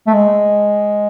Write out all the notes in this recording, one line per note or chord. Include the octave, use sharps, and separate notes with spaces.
A3
G#3